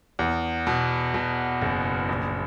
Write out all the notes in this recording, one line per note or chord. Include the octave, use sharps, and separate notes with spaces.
E2
B2
B2
F#1
A#1